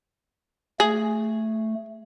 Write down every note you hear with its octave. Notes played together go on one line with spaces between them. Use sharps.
A3 G#4